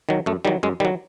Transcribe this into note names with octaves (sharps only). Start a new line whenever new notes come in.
D#3 F#3
F#2 A3
D#3 F#3 G3
F#2 G#3
D#3 F#3 G3